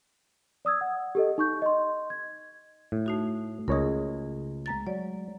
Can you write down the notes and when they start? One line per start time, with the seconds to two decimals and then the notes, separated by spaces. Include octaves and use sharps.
0.65 D5 D#6 E6 G#6
0.81 F#5
1.15 G4 A4 D#5
1.38 D#4 C#6 G6
1.62 D#5 C6
2.10 G#6
2.92 A2
3.06 A3 D#4 F#4
3.68 C#2 G#4 A#4 C#5 D#5
4.66 G#3 A#5 A6
4.87 F#3 D5